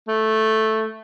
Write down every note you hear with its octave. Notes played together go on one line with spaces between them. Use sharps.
A3